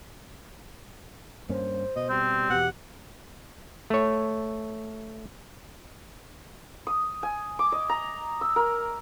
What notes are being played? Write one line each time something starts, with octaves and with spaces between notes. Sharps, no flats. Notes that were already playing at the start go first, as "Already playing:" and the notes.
G2 A#3 C#4 C5
B2 D#5
G3 C4
E2 B2 G4 F#5
A3 C#5
D#6
G#5
D6
D#5
A#5
E6
A#4